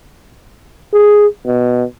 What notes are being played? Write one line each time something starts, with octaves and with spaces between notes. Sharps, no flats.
G#4
B2